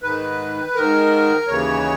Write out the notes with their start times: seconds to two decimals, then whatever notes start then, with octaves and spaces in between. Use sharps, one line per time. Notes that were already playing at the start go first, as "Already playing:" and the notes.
0.03 G#2 D#3 B4
0.75 G#2 D#3 A#4
1.47 D#2 C#3 E3 C#5